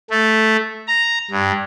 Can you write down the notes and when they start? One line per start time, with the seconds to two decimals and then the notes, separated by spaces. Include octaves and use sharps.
0.11 A3
0.88 A#5
1.31 G2